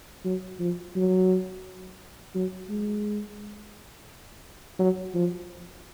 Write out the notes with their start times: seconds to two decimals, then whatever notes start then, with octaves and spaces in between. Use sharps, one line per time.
0.25 F#3
0.59 F3
0.95 F#3
2.35 F#3
2.69 G#3
4.79 F#3
5.14 F3